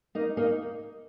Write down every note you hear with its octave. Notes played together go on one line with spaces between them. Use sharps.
A#3 D#4
A#3 D#4